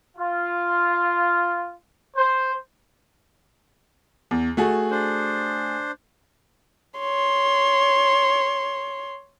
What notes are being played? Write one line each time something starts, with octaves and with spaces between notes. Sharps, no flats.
F4
C5
E2
A3 F#4 G#4
D4 C5
C#5 C6